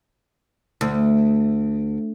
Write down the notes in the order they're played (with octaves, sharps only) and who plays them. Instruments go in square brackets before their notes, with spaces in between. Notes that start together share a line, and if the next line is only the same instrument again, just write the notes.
[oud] D2